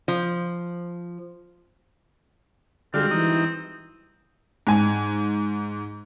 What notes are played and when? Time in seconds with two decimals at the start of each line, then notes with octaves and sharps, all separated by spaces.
0.08 F3
2.94 D3 G3 G#3 C4 F4 F#4
3.11 E3 D#4
4.67 G#2 G#5